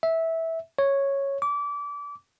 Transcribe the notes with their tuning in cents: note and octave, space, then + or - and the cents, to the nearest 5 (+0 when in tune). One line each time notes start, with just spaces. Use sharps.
E5 -15
C#5 -5
D6 -25